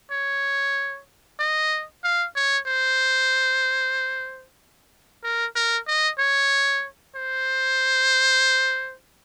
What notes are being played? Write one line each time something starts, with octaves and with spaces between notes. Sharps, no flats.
C#5
D#5
F5
C#5
C5
A#4
A#4
D#5
C#5
C5